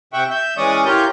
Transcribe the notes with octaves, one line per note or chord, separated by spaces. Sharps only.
C3 E5 F#5 G5 C#6
E5 G6
E3 G#3 C#4 D5 C#6 D#6
E3 F4 G4 A#4 C#5 G6